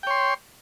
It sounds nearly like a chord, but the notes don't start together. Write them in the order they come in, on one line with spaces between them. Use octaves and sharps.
G5 C#5 C6